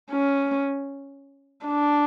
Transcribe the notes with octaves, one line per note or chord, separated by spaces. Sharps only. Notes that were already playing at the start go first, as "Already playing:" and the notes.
C#4
D4